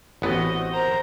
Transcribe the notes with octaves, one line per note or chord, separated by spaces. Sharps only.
A1 B3 C4 F#4 D#5
A#4 C5 A#5